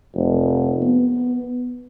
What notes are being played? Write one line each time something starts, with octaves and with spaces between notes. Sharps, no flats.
F1
B3